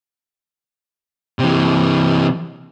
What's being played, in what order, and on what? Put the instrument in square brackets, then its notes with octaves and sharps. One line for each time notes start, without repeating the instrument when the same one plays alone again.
[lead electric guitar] C3 E3